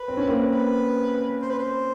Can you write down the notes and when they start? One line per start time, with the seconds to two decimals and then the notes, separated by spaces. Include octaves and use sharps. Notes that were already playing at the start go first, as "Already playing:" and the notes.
Already playing: B4
0.08 C4
0.17 C#4
0.27 A#3 C4
0.52 B4
1.42 C5
1.50 B4
1.59 C5